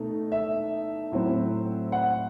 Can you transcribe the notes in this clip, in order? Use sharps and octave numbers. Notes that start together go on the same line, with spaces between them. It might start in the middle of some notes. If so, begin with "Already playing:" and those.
Already playing: B2 A3 D#4
E5
A2 F#3 C4
F#5